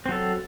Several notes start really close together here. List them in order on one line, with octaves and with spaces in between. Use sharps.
C4 F#3 A4